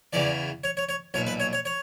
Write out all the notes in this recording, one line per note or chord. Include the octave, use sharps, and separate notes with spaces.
E2 C#3 E3 D5
C#5
C#5
C#5
B1 A#2 C#5
B4
C#5
C#5
C#5